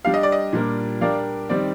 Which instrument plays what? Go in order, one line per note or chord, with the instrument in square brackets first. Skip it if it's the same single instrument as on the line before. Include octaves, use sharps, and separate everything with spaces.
[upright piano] G3 D4 G4 [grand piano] F5
[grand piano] D#5
D5
D#5
[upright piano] A#2 G3 D4 G4 A#4
[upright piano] G3 D4 G4 A#4 [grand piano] D5 F5
[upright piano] D#3 G3 C4 [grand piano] D5